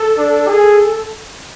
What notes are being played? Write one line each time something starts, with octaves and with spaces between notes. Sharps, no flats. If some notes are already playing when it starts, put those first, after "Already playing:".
Already playing: A4
D4
G#4